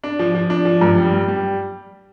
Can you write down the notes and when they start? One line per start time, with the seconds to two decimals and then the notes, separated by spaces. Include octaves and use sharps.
0.04 D4
0.19 F3
0.35 F3
0.50 D4
0.65 F3
0.81 G2
0.98 G3
1.13 G3
1.28 G3